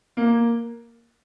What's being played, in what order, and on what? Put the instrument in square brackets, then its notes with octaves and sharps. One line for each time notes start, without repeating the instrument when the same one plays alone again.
[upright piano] A#3